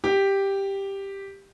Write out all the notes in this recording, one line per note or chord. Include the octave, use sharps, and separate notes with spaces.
G4